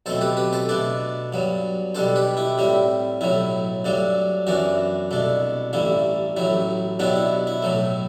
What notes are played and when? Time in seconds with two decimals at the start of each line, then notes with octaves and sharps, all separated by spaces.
0.06 B1 B2 A3 C4 A4 C5
0.21 G4 B4
0.37 G4 B4
0.53 A4 C5
0.69 B2 A3 D4 B4 D5
1.33 G2 F#3 B3
1.95 B2 G3 B3 D4 A4 C5
2.16 G4 B4
2.37 E4 G4
2.58 A2 G3 C4 E4
3.21 B1 A2 F#3 E4
3.84 G2 F#3 A3 D4
4.47 F#2 E3 B3 D4 F#4
5.11 C2 B2 A3 D4
5.73 A1 G2 D3 A3 E4
6.37 A1 A2 F#3 E4
6.99 B1 B2 F#3 B3 D4 E4 G4
7.16 E4
7.47 E4
7.62 B1 A2 F#3 A3